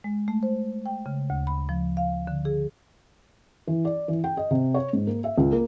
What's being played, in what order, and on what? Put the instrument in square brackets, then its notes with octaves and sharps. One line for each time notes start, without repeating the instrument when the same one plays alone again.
[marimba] G#3
A3
C5
G5
C#3
D2
B5
F3
F5
D3
G#4
[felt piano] E3
D5
E3
G5
D#5
C3
C#5
G#2
A#3
E5
C#2
A#3